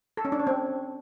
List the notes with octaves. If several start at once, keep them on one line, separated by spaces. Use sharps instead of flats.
A4
C#4
D4
C#5
C4